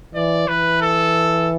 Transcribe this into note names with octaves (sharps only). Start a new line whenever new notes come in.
E3 D5
E3 B4
A4